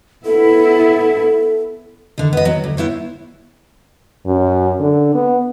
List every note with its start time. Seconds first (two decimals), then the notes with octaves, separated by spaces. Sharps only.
0.25 B3 E4 A4
2.18 D3 D#3
2.33 B3 D#5
2.45 F#3
2.64 D2
2.77 B3 E4 C5 C#5
4.26 F#2
4.80 D3
5.15 B3